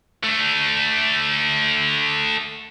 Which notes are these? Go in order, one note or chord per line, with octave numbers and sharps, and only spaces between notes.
A3 D4